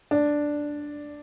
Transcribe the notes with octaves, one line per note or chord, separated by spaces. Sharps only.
D4